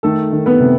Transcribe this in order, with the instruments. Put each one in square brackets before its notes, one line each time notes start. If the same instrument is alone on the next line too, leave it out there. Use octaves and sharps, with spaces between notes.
[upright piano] D#3 A3 A4
D#3
B3 B4
C3